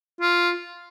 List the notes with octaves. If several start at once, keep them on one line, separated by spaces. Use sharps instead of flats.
F4